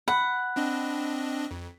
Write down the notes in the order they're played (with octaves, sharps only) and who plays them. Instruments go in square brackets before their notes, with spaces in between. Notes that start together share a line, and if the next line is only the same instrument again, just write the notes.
[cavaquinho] F#5 [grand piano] B5
[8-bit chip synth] C4 D4 D#5
F2